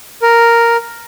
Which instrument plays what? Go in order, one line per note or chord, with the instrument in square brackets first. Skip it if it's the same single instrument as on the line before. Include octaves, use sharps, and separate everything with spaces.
[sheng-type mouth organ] A#4